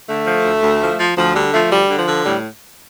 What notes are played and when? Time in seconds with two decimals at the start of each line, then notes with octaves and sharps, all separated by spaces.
0.09 D3 A3
0.26 F3
0.44 D2
0.62 D2
0.80 F3
0.99 F3
1.17 D2 F3
1.35 D3 G3
1.53 F3 A3
1.71 D2 G3
1.90 D3
1.98 F3
2.08 D3
2.25 A2 G3